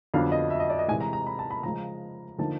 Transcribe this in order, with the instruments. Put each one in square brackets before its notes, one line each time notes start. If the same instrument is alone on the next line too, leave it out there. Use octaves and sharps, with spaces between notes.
[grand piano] F2 D3 F#3 B3 D4 F5
D#5
E5
D#5
D5
D#5
C3 E3 G#3 G#5
A#5
A#5
B5
A5
B5
C#3 F3 G#3 A#5
D3 F3 A#3 D#4 A5